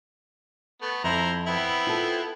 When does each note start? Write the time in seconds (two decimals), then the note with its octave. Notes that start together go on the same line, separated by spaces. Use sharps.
0.82 A3 B3
1.04 F2 E4 C5 A#5
1.46 B3 C4 E4
1.87 F4 A4